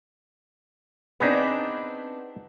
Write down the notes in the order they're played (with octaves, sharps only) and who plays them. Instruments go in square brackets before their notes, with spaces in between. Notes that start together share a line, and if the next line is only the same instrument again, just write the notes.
[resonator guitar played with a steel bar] B3 C4 D4 [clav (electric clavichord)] D#4 G#4 B4